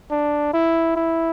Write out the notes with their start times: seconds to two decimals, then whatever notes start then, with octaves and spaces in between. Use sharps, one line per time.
0.11 D4
0.53 E4
0.96 E4